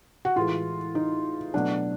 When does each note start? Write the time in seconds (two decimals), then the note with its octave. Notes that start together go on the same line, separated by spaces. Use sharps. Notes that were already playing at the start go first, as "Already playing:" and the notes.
0.25 F#4
0.36 A2 E3 G#3 F4
0.95 D#4
1.54 B2 F#3 A3 D4